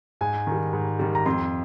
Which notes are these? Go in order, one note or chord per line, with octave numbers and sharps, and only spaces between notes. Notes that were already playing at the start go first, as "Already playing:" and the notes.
G#2 G#5
D#3 G3
G#2
D#3 G3
A#5
F2 C6